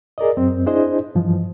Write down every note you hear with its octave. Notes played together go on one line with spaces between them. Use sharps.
G#4 A#4 D5 D#5
F#2 C4
D4 E4 G#4 C5 D#5
G2 E3 F3